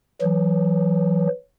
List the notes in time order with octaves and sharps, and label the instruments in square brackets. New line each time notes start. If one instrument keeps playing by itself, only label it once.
[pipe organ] E3 F#3